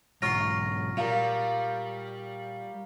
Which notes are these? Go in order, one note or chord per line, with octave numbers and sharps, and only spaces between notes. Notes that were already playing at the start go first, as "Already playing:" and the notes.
B1 G#2 F#3 F4 C6 C#6 F6 A#6
A#2 G3 A#4 F5